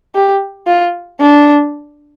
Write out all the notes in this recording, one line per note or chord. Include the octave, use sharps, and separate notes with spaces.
G4
F4
D4